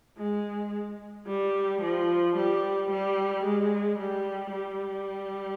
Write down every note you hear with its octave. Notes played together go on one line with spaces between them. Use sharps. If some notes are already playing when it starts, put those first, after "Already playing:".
G#3
G3
F3
G3
G3
G#3
G3
G3